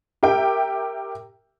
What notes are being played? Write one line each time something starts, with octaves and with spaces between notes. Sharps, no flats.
G4 A#4 E5 G5